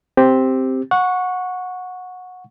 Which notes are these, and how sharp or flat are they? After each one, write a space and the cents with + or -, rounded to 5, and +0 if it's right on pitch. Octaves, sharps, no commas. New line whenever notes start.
C4 +0 G4 +0
F#5 -20 C#6 +0